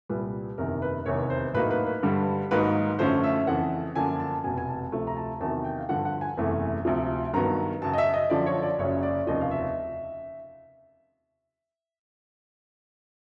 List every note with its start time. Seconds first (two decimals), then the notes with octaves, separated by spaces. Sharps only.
0.09 C2 A#2 G3 B4
0.58 F#1 E2 C3 D#3 A#4
0.82 B4
1.06 F1 E2 C3 D#3 C#5
1.30 C5
1.54 A2 F#3 A#3 D#4 B4
1.71 B4
1.86 B4
2.03 G2 D3 G3
2.51 G#2 D#3 F#3 A#3 D#4 B4
2.99 F#2 D3 F3 A3 C#4 C5
3.24 E5
3.47 F2 C#3 E3 F#5
3.95 F#2 D3 F3 A#3 D4 G#5
4.20 A5
4.44 F1 E2 B2 G#5
4.58 G#5
4.68 A5
4.92 D2 C3 F3 A3
5.07 A#5
5.16 A5
5.40 E2 C3 D#3 F#3 A5
5.64 G5
5.78 F5
5.89 G2 D3 F3 F#5
6.05 F#5
6.21 G#5
6.37 F#1 E2 C3 E3 A3
6.85 D2 C3 F3
7.33 G2 D#3 F#3 B3 A#5
7.82 F#2 C#3 F#3 A5
7.93 D#5
7.98 E5
8.14 D#5
8.30 F#2 D3 F3 D5
8.46 C#5
8.63 D5
8.78 F#1 F#2 C#3 F#3 C#5
9.03 D5
9.27 F1 D#2 C#3 F3 D#5
9.41 F5
9.51 E5